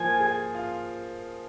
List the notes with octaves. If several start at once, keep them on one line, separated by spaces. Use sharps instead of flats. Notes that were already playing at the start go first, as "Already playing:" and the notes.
Already playing: F3 A#3 G#5
G#4
F4